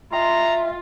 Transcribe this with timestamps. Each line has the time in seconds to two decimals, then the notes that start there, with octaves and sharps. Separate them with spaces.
0.13 F4 D#5 E5 G5 A#5 C6